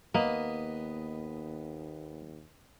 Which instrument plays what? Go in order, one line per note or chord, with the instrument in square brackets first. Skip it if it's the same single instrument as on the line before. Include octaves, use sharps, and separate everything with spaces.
[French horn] D#2 [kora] A#3 [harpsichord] B3 D#5 B5